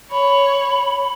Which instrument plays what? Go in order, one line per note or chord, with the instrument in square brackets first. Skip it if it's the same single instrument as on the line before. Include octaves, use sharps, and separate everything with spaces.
[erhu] C#5 [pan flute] B5